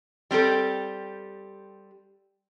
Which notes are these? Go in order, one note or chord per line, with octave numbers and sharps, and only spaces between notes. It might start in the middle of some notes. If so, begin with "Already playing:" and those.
G3 C4 G4 A4